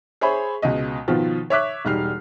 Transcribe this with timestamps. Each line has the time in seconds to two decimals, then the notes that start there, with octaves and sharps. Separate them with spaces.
0.21 G#4 C5 C#5 E5 B5
0.62 C#2 B2 D#5
1.08 B2 D#3 F3 B3 F4
1.50 C#5 E5 D6 F#6 B6
1.85 E1 G3 D#4 F6 C7